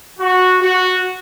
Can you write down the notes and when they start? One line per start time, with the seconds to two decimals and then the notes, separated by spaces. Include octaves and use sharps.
0.19 F#4
0.60 F#4